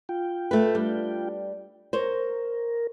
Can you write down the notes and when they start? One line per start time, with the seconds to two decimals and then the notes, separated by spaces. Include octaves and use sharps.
0.09 F4 G5
0.51 A3 B4
0.75 G3 D4
1.93 A#4 C5 C#5